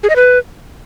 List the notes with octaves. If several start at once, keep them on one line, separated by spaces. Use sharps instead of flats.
G#4
D#5
B4